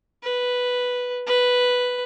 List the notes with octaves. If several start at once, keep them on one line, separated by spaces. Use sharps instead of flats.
B4
B4